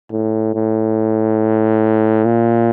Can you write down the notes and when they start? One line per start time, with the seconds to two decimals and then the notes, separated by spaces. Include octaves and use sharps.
0.12 A2
0.55 A2
2.25 A#2